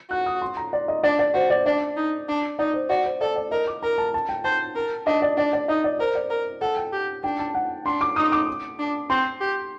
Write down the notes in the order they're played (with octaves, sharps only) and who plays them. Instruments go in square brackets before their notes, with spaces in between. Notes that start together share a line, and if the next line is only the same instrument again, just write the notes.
[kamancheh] F#4 [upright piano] F#6
[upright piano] D#6
C6
A#5
D5
D#5
[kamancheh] D4 [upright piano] D5
[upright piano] D5
[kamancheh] F#4 [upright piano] C5
[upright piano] D5
[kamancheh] D4 [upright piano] D5
[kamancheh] D#4
D4
[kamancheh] D#4 [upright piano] D5
[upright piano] C5
[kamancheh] F#4 [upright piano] D5
[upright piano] C5
[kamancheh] A4 [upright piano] D5
[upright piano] D5
[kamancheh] A#4 [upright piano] D#5
[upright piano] D6
[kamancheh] A#4 [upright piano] A#5
[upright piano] A5
A5
G5
[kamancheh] C5 [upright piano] A5
[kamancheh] A#4
[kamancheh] D4 [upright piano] D#5
[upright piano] D5
[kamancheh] D4 [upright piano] D5
[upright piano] D5
[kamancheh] D#4 [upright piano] D#5
[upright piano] D5
[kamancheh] A#4 [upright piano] C5
[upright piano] D5
[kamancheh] A#4
[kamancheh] A4 [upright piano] F#5
[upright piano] G5
[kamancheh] G4
[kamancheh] D4 [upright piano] G5
[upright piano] A5
F#5
[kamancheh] D4 [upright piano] C6
[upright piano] D6
[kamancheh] D#4 [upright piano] D#6
[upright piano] D6
[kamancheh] D4
[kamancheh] C4 [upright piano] C6
[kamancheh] G4